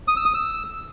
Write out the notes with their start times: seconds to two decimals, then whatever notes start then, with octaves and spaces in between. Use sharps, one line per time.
0.08 D#6
0.17 E6
0.25 D#6
0.34 E6